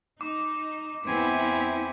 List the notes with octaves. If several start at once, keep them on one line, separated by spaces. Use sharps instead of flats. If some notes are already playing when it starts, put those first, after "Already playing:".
D#4 D6
E2 B3 C4 E4 G#5